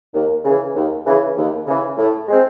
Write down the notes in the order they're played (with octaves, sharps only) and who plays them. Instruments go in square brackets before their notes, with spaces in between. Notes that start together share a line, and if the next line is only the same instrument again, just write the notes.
[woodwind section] D#2
C#3 E3
D#2
C#3 E3
D#2
C#3 E3
A2
G#3 C4